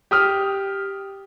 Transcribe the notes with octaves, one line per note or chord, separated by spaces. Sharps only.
G4 D#6 F6